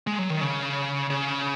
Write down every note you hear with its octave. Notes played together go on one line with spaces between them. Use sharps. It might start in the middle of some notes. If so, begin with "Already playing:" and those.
G#3
F#3
D#3
C#3
C#3